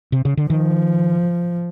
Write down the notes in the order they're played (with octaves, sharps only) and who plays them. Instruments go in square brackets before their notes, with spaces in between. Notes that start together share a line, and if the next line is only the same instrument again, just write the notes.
[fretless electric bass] C3
C#3
D3
[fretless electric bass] D#3 [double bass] F3